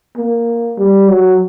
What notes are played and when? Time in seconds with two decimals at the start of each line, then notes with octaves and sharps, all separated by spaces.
0.17 A#3
0.78 G3
1.08 F#3